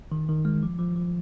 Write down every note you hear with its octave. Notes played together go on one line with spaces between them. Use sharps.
D#3
D#3
G#3
F3
F3
F3